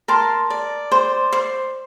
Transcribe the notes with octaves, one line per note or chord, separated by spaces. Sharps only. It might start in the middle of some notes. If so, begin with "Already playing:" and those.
A#4 A5 C6
D5
C5
C5